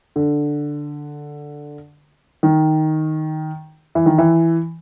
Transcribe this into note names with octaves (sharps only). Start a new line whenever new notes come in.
D3
D#3
E3
D#3
E3